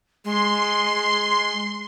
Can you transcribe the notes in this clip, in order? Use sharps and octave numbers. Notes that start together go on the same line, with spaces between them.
G#3 C6